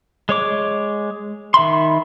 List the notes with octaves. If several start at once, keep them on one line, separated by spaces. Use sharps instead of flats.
G#3 C#5 D6
D#3 E5 B5 C6